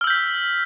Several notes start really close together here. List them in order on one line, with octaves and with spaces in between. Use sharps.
F6 E6 G6 B6